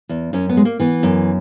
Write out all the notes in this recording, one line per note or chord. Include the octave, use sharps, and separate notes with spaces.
E2
F#2 C#4
B3
G#3
A#3
E3 B3
F#2